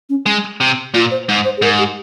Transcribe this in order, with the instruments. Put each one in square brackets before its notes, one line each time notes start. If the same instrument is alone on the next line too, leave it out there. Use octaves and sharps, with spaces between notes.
[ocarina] C#4
[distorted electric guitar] G#3
C3
[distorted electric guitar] A#2 [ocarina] F4
[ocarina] C5
[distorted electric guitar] G#2
[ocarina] C5
G#4
[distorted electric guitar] G#2 [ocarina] A#4
[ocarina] G4